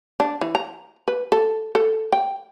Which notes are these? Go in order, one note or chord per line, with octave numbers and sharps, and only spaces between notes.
D4
E3
A#5
B4
A4
A4
G5